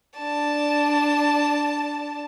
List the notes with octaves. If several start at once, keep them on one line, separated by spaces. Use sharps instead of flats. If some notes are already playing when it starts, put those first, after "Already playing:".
D4 A5